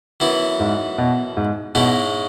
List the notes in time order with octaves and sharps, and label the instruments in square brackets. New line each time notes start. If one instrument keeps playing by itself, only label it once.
[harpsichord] F#2 E3 B3 E4
[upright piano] G#2
B2
G#2
[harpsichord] G#2 G#3 C#4 E4 [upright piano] B2